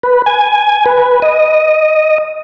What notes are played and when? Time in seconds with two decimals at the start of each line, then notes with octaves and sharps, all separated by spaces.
0.03 B4
0.26 G#5
0.86 B4
1.22 D#5